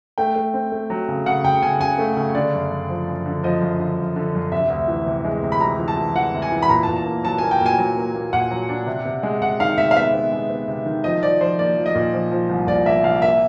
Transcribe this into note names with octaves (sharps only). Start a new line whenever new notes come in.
A3 G5
A3
C4
A3
F#3
C#3
C#3 F#5
C#3 G5
C#3 G#5
C#3 G#5
A3
C#3
D3 D5
F#2
F#2
F3
F#2
D3
F3 D#5
F#2
D3
F#2
D3
F#2
C3 E5
D2
E3
C3
G#3
C3
B5
E3 A#5
E3
A5
E3
E3 F#5
C3
G#5
E3
B5
A#2 A#5
A5
A#2
A5
A#3
F#3 A5
A#3 G#5
G5
A#2 G#5
F#3
A#3
A#3
A#2 F#5
F#3
D4
C3
C3
G#3
C3 F#5
D#3 F5
C3 E5
F5
B3 E5
B3
G#3
B3
C3
D#3
F3 D#5
F3 D5
F3 C5
A#3 D5
F3
D#5
A#2
F3
F3
C2
A#2 D5
A#3 E5
C2 F5
A#3 E5